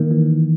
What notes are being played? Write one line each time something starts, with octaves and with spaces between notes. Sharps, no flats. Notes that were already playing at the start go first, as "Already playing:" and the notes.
Already playing: D#3 A#3
E3